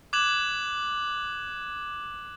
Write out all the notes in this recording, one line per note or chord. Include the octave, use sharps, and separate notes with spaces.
D6 F#6 G#6 E7 F#7